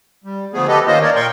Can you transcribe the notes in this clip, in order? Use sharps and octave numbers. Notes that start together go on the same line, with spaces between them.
G3
D2 F3 A3 B3 G#4
G4 A4 B4 D#5
D#3 A#3 C#4 F4 C5 D#5
D#4 A#4 C#5 D5
A#2 A#4 G5 C6 C#6